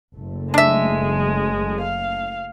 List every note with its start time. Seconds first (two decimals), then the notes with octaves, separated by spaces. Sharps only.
0.15 F#1 A3
0.54 G#3 D4 E5
1.79 F5